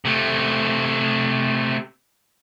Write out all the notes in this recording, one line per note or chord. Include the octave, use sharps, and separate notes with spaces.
C3 A3